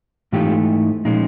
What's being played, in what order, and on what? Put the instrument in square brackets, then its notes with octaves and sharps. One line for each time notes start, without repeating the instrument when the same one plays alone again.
[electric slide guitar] G#2 E3 A3 D#4 F4 G4
A#2 F3 G#3 C#4 D#4